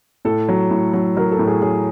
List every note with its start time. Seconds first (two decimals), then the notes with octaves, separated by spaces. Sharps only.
0.25 A2 A4
0.49 F#3
0.71 A2
0.94 F#3
1.17 F#3 A#4
1.32 A4
1.39 A2
1.47 G#4
1.62 F#3 G#4